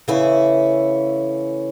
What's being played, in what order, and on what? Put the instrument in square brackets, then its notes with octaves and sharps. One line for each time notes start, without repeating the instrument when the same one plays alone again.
[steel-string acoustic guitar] C#3 E3 A3 C#4 E4